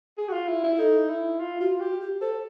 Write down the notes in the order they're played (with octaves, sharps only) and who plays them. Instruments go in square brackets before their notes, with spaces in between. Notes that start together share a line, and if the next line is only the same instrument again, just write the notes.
[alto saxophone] G#4
F#4
F4
E4
E4
[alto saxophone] D#4 [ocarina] A4
[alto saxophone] E4
F4
[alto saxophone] F4 [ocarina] F#4
[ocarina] F#4 [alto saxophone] G4
[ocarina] G4
[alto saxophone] A4 [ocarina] C5